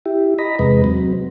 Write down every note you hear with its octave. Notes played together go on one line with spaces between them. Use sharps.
E4 G4
D#5 A#5 B5
E2 C3 G#3 B4
F#3 C4